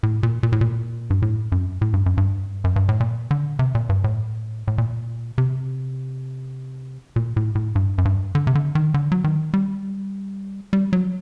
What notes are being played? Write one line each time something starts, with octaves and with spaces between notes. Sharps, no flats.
A2
A#2
A#2
A2
A#2
G2
A2
F#2
A2
G2
F#2
G2
F#2
G2
A2
A#2
D3
C3
A#2
G2
A2
A2
A#2
C3
A#2
A2
A2
G2
F#2
G2
D3
C3
D3
D#3
D3
F#3
D#3
G3
G3
F#3